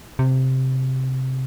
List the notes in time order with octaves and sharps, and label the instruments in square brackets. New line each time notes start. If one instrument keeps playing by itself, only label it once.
[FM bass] C3